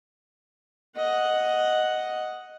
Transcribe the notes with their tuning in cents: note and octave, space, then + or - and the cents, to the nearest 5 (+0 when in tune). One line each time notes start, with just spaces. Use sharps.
D#5 +0 F#5 +0